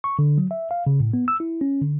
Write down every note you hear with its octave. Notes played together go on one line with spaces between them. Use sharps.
C#6
D3
F#3
E5
F5
C#3
A2
B3
E6
E4
C#4
D3